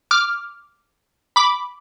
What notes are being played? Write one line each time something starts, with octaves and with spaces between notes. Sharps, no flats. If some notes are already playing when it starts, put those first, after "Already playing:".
D6 F6
B5 D6